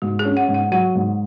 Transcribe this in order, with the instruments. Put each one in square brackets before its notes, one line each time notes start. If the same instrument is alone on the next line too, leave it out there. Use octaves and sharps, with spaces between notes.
[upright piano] G#2 [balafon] F#4
[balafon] G#4
[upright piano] C#4
[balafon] F#5
[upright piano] G#2
[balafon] F#5
[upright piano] F#3 [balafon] F#5
[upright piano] G#2